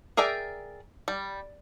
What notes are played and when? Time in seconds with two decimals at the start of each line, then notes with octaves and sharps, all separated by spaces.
0.17 G#4 A#4 D5 E5 G5
1.08 G3